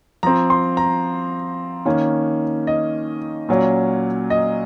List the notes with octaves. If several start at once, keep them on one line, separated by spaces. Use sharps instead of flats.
F3 C4 A#5
C6
A#5
D#3 A#3 C#4
D#5
A#2 F#3 C#4
D#5